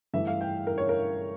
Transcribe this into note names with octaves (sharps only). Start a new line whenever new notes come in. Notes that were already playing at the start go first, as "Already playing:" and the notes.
G2 E3 A3 E5
F5
G5
A#4
C#5
A#4